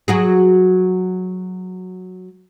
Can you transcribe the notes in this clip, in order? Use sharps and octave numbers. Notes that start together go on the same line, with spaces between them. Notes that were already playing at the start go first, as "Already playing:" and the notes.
F#3 F#4 G#4